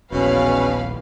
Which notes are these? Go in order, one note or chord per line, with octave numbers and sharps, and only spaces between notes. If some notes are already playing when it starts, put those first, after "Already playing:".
D#1 A#1 E2 B2 C#4 B4 F5